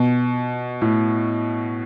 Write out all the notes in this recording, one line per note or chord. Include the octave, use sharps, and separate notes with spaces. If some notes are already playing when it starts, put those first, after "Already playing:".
Already playing: B2
A2